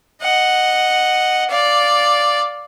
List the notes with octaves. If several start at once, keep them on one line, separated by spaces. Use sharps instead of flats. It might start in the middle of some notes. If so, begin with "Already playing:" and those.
D#5 F#5
D5 F5